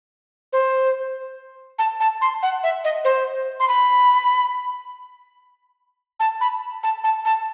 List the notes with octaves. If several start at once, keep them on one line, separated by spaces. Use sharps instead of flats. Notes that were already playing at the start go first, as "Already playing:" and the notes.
C5
A5
A5
C6
F#5
E5
D#5
C5
C6
B5
A5
B5
A5
A5
A5